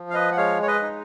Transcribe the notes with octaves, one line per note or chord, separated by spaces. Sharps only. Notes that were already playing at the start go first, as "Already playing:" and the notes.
Already playing: F3
F5
B4 D#5
F#5
G#3 C#5 F5
C#5
B4 D#5
D#4